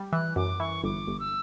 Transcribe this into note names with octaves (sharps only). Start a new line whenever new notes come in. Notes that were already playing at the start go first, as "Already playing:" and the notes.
Already playing: G3
E3 F#6
F#2 D6
E3 C#6
G1 D6
G1
E6